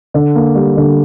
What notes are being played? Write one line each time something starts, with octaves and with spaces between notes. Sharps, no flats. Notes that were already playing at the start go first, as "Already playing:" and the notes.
D3
A#3
G3
D3